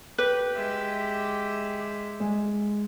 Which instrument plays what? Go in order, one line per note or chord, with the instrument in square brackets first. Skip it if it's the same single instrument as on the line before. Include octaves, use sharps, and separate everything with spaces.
[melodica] G4 G5 [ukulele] B4
[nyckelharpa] G#3 E5
[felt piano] G#3